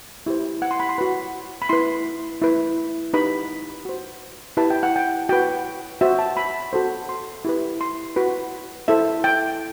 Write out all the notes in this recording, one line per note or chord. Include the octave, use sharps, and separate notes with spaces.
E4 G4 C5
F#5
C6
B5
C6
F#4 B4 B5
B5
E4 B4 C6
E4 B4
D#4 G4 B4 B5
F#4 C5
E4 G4 B4 A5
G5
F#5
G5
F#4 B4 G5
F#4 C5 E5
A5
B5
F#4 A4 C5
C6
E4 G4 B4
C6
F#4 B4
E4 A4 C5 E5
G5